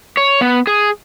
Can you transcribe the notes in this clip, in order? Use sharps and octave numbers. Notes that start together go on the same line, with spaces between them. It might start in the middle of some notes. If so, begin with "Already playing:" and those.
C#5
B3
G#4